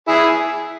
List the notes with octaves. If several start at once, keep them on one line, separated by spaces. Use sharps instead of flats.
E4 G#4